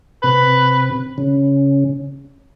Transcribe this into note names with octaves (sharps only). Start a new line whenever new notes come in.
C3 B4
C#3